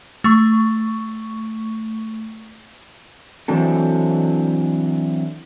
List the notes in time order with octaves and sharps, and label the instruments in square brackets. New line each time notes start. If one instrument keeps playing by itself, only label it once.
[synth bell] A3 C#6
[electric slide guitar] E3 F#3 C4 D4 A4